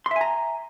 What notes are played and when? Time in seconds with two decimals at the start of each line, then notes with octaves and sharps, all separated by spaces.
0.06 C6
0.11 E5
0.16 G#5
0.21 A#5